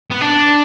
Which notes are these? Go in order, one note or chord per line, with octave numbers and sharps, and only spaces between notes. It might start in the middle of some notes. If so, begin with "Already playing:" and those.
B3
D4